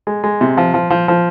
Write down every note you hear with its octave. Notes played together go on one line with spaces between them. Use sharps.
G#3
G#3
C3
F3
F3
F3
F3